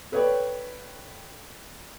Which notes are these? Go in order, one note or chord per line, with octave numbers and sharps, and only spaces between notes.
A4 B4 C#5 D5 G5